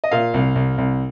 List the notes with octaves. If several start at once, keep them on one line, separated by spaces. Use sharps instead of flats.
D#5
A#2 F5
C2
C2
C2